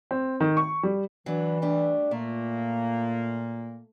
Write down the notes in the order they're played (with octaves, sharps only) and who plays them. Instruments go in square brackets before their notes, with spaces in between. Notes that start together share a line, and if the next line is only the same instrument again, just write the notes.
[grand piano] C4
D#3
C#6
G3
[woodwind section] E3 [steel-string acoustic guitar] F#3 D4
[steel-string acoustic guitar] G3 A3 D4
[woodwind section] A#2 A#3 [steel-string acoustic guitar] A3